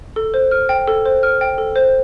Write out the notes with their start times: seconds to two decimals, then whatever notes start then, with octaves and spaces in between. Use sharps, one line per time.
0.16 A4
0.34 C5
0.51 F6
0.69 G5
0.88 A4
1.06 C5
1.23 F6
1.41 G5
1.58 A4
1.76 C5